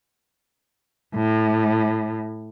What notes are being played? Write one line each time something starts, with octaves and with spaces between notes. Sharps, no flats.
A2